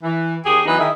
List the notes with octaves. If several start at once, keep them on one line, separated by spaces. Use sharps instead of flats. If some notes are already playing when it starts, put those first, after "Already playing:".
E3
D#2 G4 G#4
E3 F#3 B3 D#4 B4
D#3 E4 G#4 D#5 E5